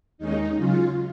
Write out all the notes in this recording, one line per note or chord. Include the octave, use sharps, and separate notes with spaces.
D#2 D#3 G#3 C#4 D#4
C#3 F#3 C#4 F4